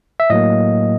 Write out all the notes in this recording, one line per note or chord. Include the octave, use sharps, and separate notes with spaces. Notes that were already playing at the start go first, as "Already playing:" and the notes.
E5
A2 F#3 A#3 D#5